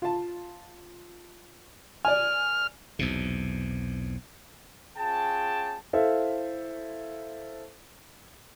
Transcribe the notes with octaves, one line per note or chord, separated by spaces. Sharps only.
F4 A5
D5 G#5 F6
B1 E2 C3
C#4 F4 G#4 G5 A5
E4 A4 C5 E5 F5